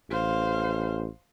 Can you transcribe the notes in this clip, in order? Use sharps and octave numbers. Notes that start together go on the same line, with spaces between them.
A1 C5 F5